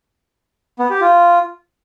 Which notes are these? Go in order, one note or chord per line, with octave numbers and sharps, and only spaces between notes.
B3
G4
F4